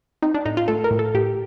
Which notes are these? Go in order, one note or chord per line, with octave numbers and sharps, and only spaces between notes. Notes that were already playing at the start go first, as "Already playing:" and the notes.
C4 D#4
D4
A2 D#4
F4
A3 A4
A#4
A2
A4
A2 G4